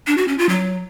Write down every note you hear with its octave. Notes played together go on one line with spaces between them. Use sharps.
D4
F#4
C#4
F4
F#3